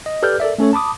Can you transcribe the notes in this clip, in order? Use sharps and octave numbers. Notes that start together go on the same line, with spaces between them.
D#5
G4 A4 B4 D5 F6 G6
A4 A#4 D5 E5
A3 C#4 A4 C#5
A5 B5 D6 D#6